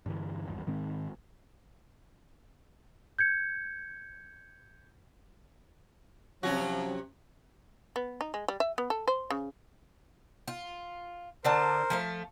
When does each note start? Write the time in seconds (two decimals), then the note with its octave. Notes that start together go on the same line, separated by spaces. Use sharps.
0.06 G2 D3 E3
0.47 G#1 E2 G2
0.67 G#2 D#3 G#3 C4
3.19 G6 G#6 C#7
6.43 C3 F3 F#3 C#4 F#4
7.96 B3
8.21 D#4
8.34 G#3
8.48 G3
8.60 E5
8.78 B3
8.90 A4
9.07 C5
9.30 C#3
10.48 F4
11.45 D3 D4 A#4 C5 A5
11.90 F3 A3 F5